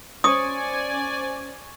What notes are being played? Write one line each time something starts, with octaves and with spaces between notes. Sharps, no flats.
C#4 C5 D5 G#5 C#6 D#6